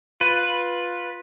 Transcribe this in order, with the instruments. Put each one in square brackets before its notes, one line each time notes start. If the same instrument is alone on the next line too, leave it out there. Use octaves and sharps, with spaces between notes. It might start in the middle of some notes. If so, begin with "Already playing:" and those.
[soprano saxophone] F4 [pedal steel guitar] B4